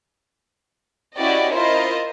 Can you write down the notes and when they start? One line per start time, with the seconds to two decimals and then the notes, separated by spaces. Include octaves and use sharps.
1.16 C#4 E4 F#4 G4 D5 D#5
1.52 E4 F4 A#4 C5 D#5